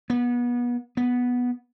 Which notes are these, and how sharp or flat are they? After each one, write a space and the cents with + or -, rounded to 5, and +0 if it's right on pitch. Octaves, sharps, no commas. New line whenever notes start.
B3 -30
B3 -5